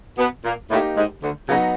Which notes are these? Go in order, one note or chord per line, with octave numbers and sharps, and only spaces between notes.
B2 B3
A#2 A#3
A2 A3 A#3 D#4 G4
G#2 G#3
D2 D3
C#3 F#3 B3 D#4 F#4